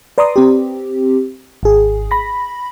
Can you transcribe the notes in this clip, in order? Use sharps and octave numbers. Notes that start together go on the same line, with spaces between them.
B4 D5 A#5 C6 D6 D#6
C4 G4
G#1 G#4
B5 A#6